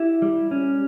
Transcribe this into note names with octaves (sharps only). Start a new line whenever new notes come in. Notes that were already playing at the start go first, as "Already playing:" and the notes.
Already playing: E4 G4
G3
C#4